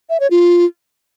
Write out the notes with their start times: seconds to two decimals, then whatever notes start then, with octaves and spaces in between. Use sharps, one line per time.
0.10 E5
0.20 C#5
0.31 F4